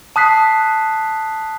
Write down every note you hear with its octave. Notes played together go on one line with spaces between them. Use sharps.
A5 D#6 F#6 B6 C7